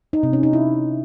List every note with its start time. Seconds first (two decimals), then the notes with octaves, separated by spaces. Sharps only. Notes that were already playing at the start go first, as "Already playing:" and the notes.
0.13 D#4
0.23 C3
0.33 C#4
0.43 D#4
0.53 E4